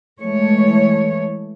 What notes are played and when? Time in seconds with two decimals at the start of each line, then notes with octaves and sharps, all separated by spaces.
0.21 E3 G#3 A3 C#5